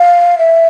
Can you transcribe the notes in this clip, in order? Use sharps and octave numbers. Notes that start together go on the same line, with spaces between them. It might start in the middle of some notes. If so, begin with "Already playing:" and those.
Already playing: F5
E5